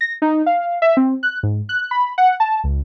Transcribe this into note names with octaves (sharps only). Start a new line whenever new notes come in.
A#6
D#4
F5
E5
C4
F#6
G#2
F#6
B5
F#5
A5
C#2